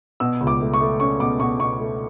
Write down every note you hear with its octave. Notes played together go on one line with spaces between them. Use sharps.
B2 E6
C#2
D6
A3
C#6
A3
C#4 C#6
B2 D6
B2 C#6
B2 C#6
A3